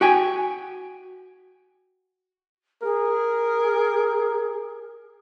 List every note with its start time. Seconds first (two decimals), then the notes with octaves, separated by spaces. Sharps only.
0.01 F#4 G5 G#5
2.82 G#4 A#4